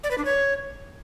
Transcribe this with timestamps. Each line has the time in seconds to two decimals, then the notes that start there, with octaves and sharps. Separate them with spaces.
0.04 D5
0.11 B4
0.18 D4
0.25 C#5